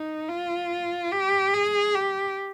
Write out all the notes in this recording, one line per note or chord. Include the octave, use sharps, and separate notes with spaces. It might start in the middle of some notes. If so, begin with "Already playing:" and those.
Already playing: D#4
F4
G4
G#4
G4